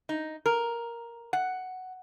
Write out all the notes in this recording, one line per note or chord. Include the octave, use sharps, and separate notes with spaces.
D#4
A#4
F#5